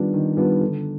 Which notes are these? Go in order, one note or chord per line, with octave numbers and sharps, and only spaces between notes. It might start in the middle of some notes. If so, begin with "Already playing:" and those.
Already playing: D#3 G3 B3 D4 F4
D#3
G3 B3 D4 F4
D3